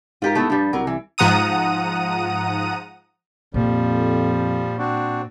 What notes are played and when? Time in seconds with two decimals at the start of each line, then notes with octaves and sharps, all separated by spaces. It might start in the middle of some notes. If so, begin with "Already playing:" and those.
0.22 G#2 F4 G4 A#4
0.35 A3 B3 E4
0.50 G2 F3 G3
0.73 C2 F#3 A#4
0.87 E3
1.18 G#2 F3 F#5 A#5 D#6 D#7
3.54 F2 A#2 F3 G3
4.78 C4 D4 F#4